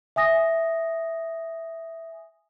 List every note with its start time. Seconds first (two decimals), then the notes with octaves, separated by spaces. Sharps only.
0.16 E5 G#5 D#6 A#6